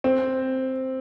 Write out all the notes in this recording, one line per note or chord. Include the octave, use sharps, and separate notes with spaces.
C4